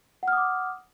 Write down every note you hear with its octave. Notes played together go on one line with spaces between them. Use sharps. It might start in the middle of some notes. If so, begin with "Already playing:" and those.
F#5 D6 D#6 F6